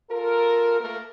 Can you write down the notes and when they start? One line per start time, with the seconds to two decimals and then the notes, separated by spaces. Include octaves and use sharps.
0.10 F4 A4 A#4
0.80 A3 A#3 A#4